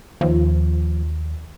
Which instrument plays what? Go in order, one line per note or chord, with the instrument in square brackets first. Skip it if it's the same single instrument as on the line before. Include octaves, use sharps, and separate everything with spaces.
[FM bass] D#2 [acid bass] F3